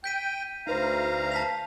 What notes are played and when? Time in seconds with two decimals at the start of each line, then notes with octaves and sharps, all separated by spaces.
0.04 G5 G6 B6 D#7
0.67 D2 D#4 B4 C5 F5 A#5
1.32 A5 B6 F7